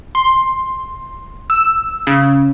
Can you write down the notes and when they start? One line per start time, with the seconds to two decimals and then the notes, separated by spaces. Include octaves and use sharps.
0.15 C6
1.50 E6
2.07 C#3